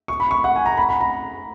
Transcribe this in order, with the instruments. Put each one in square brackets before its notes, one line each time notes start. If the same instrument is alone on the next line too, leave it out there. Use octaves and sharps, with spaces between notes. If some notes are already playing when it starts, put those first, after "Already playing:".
[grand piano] C#6
B5
C#6
F#5
G#5
A#5
B5
B5
A#5